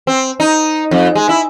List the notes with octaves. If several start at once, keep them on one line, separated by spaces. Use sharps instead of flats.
C4
D#4
F2
G#3
E4